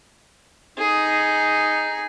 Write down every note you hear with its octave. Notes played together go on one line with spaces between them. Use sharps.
D#4 G#4